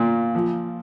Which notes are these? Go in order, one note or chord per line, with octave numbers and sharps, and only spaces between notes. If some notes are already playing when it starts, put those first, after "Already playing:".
Already playing: A#2
F3